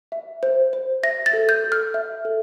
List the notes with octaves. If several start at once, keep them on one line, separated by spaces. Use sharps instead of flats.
E5
C5
C5
E5 A#6
A6
A4
G6
A4
F6
E5
A4